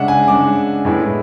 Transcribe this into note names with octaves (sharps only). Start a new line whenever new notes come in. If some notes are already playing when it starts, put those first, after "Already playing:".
Already playing: C#3 G#3 D4 E5 F#5
G#5
C#3 G#3 D4 D6
A2 G#3 B3 E4